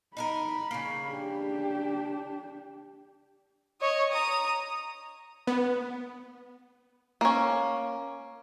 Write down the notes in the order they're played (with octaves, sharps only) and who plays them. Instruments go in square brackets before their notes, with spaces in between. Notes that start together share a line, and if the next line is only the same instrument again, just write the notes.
[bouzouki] D#4 E4 A#4 [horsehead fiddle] B5
[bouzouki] C#3 A#3
[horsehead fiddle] D4 G4
[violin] C#5 D#5
A#5 D#6
[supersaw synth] B3
[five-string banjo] A#3 C#4